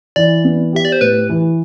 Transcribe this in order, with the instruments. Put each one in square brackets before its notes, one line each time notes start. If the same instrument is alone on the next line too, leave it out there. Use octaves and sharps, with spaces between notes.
[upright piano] E3 [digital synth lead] D5
[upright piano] B3
[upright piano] G4 [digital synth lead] E5
[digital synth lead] D5
C5
[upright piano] A2 [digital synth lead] B4
[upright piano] E3